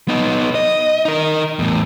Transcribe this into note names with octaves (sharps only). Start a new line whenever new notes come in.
B3 D#4
D#5
D#4 A#4
E2 A2